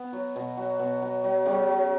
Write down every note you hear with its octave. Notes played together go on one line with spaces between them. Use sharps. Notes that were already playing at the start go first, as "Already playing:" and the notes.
Already playing: B3
F#3
B2
F#3
B2
F#3
F#3
C#3 F#3 C#4
F#3